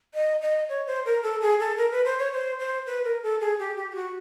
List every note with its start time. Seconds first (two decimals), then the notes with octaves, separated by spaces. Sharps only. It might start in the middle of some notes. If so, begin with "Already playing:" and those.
0.14 D#5
0.42 D#5
0.69 C#5
0.87 C5
1.05 A#4
1.23 A4
1.41 G#4
1.60 A4
1.77 A#4
1.92 B4
2.05 C5
2.19 C#5
2.33 C5
2.59 C5
2.87 B4
3.04 A#4
3.23 A4
3.41 G#4
3.59 G4
3.77 G4
3.91 G4
3.95 F#4